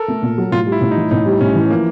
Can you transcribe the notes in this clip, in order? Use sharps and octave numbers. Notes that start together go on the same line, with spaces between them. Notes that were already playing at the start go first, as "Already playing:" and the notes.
Already playing: A4 A#4
A3
A#2
F#3
A2 F4
G3
E4
A2
D#4
E3
A2 D#4
G3
A2 C#4
E3
F3 A#3